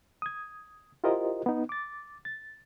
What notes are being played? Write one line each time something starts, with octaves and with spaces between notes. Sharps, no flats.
D#6 G#6
E4 F4 G4 A#4 C5 D#5
B3 D#4
D6 A6
A6